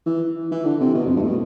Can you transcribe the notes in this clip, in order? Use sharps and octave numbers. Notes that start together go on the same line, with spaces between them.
E3
E3
D3
C3
B2
F2
G2
A2
B2